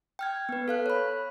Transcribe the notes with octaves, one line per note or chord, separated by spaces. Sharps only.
G5 F6 G#6
B3 B4
A4 F5 F#6
C#5 B5